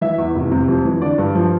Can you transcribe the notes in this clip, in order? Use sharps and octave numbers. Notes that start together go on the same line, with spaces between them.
E3 E5
E2
F1
C3
F2
E3
D3 D5
G2
F3